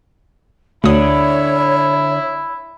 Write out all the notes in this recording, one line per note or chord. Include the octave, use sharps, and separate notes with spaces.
D2 D3 D4 E4 C#5 D#6